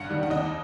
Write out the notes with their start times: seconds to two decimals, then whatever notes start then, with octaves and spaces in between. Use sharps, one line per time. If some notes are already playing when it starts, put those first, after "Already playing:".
Already playing: G2 F#5
0.09 D#3 G3
0.23 F#5
0.30 D#2 D#5